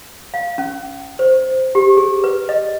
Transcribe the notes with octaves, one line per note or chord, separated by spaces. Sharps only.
F5
C#4
C5
G4
G#4
B4
D#5